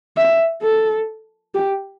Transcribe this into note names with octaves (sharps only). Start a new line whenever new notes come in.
E5
A4
G4